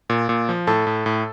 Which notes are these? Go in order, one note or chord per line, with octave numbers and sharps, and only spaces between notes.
A#2
A#2
F3
A2 A4 A5
A2
A2